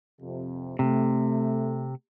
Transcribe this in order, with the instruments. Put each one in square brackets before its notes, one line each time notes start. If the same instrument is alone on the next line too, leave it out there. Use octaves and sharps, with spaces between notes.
[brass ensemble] F2 C3
[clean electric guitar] C3 [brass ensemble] A3